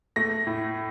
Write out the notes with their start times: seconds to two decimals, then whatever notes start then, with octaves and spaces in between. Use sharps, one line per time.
0.16 A3 A#6
0.47 A2